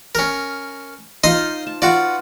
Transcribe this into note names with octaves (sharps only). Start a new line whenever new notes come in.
C#4 A#4
D#4 F4 C5 D#5 C6 D#6
A5
F4 F#4 B4 D5